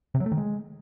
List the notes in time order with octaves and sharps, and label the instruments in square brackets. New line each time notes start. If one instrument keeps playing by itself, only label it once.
[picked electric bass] C3
F#3
A3
D#3
G#3